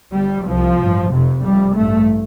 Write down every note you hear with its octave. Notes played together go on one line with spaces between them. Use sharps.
G1 G2 G3
C2 C3 F3
A1 G2
F1 F2 C3
F1 F2 C3 G3
A1 G2 A3